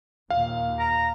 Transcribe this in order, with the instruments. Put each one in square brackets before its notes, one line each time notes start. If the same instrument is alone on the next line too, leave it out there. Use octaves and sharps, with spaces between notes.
[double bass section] D#2 A#2 [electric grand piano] F5
[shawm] A#5